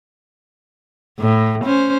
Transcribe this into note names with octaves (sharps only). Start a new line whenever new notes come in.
A2
C#4 C5